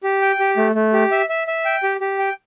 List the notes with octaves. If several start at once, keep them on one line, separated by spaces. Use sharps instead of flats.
G4
G5
G4
A3
A3
G4
E5
E5
E5
G5
G4
G4
G5